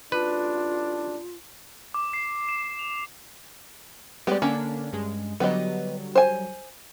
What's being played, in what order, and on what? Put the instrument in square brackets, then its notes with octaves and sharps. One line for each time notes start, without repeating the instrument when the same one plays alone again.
[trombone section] A1 D4 [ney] F4 [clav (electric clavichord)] B4
[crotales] D6
C7
E7
F7
[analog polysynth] G3 G#3 G4 [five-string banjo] B3 D5
[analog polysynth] D3 A#3 D4 [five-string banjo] C#4
[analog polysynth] G2 G#3
[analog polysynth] D3 F#3 G3 [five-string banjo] B3 D#5
[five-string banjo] C5 G#5